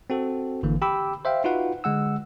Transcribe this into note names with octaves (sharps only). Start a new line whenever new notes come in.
C4 F#4 A4
G#1 D3 E3 A#3
G4 G5 B5 D6 E6
C5 E5 F5 G5
D#4 F4 F#4 B4 F#5
D3 G#3 F#5 E6